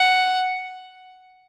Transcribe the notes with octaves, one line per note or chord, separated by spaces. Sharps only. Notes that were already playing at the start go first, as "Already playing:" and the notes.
Already playing: F#5